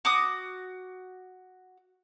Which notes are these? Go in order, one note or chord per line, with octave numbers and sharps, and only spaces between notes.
F#4 D6 D#6